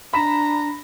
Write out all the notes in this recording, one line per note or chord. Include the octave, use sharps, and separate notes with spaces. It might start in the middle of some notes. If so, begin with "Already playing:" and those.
D4 A#5 B5 B6 E7